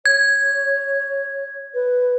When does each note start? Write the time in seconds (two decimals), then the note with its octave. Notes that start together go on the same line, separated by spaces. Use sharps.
0.06 C#5 G#6
1.74 B4